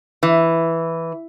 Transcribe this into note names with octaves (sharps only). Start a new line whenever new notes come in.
E3